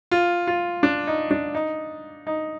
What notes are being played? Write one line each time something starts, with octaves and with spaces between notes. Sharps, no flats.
F4
F4
D4
D#4
D4
D#4
D#4